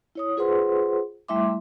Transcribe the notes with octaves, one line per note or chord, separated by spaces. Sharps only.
E4 C#5 D#6
F4 G#4 B4 C5 F#5 C6
G3 A3 E4 E5 C6 D6